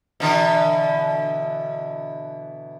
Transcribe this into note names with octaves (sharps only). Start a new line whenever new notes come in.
B2 D3 E3